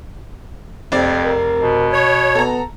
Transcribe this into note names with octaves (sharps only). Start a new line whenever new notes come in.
F1 F2 C4 D5
A#4
B2
C#5
B3 A4 A#5